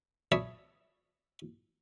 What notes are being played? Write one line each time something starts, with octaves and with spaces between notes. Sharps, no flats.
C#5 D5 E5 A5 B5 D#6